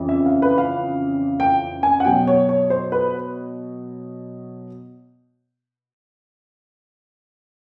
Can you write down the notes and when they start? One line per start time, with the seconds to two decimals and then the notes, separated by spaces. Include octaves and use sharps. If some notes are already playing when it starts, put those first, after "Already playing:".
Already playing: F2 C#3 E3
0.09 E5
0.26 F5
0.42 B4
0.58 F5
1.40 G5
1.83 G#5
2.00 F#5
2.05 B2 F#3 G5
2.27 C#5
2.49 C#5
2.70 C5
2.92 B4